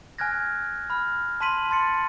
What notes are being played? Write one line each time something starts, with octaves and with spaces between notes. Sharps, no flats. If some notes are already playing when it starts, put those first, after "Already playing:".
G#5 F6 F#6 G#6 A#6
B5 F6
A5 C6 B6 D#7 F#7
A5 C6 A6 C#7